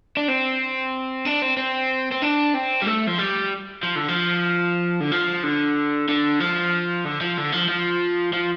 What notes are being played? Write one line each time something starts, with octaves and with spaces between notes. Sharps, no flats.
D4
C4
D4
C4
C4
C4
D4
C4
G3
A3
F3
G3
F3
D3
F3
D3
F3
D3
D3
F3
D3
F3
D3
F3
F3
F3